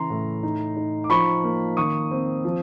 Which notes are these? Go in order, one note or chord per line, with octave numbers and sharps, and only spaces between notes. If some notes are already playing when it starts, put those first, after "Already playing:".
Already playing: C#3 E3 A#5 C6
A2
D#4
D#4
D6
F3 B5 C#6
A#3
D#3 C#6 D#6
C4
F3